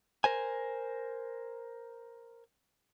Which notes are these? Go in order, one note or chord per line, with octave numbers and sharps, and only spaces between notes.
A#4 C5 G#5